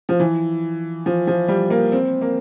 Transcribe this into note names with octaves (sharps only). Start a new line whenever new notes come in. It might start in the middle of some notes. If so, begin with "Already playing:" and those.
F3
E3
F3
F3
G3
A#3
C4
A#3